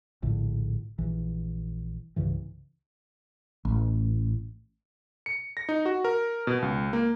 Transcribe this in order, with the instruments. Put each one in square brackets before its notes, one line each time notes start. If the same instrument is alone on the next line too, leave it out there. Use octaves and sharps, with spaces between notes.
[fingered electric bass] A#1 A2 D3
A#1 E3
C2 G2 C#3 E3
[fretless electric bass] A1
[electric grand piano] C#7
A#6
D#4
F#4
A#4
B2
C#2
A#3